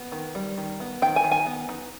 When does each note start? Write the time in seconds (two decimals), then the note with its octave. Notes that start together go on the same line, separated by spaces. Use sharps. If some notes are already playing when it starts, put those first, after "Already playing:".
Already playing: B3
0.12 D#3
0.35 G3
0.57 D#3
0.80 B3
1.02 D#3 G5
1.16 G#5
1.24 D#3
1.31 G#5
1.46 B3
1.69 D#4